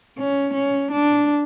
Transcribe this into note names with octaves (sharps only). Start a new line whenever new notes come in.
C#4
C#4
D4